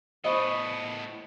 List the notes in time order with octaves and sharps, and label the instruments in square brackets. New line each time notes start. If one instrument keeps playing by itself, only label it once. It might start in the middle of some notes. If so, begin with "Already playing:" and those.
[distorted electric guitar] A2 B3 [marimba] C5 B5 C#6 [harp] D#5